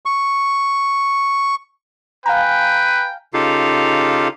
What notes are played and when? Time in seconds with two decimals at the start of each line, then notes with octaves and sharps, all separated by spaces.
0.06 C#6
2.26 B4 F5 G5 G#5 A#5
3.34 C#3 D#4 F4 G4 A4 F5